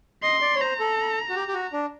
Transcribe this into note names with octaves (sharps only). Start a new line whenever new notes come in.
D#5 C6
D5
C#5
C5 A#5
A4
F#4
G4
G4
F#4
D4